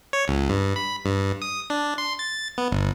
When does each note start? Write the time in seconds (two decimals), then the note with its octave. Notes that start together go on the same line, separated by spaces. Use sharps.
0.13 C#5
0.28 C#2
0.49 G2
0.76 B5
1.05 G2
1.42 D#6
1.70 D4
1.98 C6
2.19 A6
2.58 B3
2.72 G1